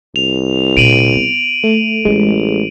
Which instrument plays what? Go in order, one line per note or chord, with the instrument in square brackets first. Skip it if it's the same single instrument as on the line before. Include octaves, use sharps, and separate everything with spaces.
[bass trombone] C2 [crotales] F7
[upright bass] A#2 D3 [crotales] D7 D#7 F#7
[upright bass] B3
[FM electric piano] A3
[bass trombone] A1 [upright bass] G3 [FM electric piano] G#3